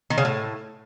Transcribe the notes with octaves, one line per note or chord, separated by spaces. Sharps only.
D#3
C#3
A2